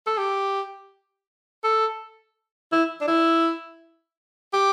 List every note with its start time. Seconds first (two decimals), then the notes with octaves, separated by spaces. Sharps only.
0.06 A4
0.18 G4
1.64 A4
2.72 E4
3.01 D4
3.08 E4
4.53 G4